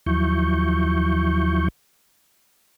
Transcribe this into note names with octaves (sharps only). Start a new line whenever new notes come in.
D#2 F3 F#3 E4 C#6 G6